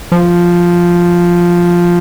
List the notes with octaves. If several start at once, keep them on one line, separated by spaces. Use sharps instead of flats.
F3